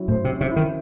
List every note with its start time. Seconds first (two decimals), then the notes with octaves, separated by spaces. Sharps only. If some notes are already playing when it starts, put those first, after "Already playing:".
Already playing: F#3 C#4 E4
0.08 A2 C5
0.25 C3
0.30 C#4
0.41 C3
0.51 E4
0.56 D#3